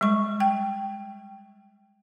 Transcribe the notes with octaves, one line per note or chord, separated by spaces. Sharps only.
G3 G#3 C#6
G5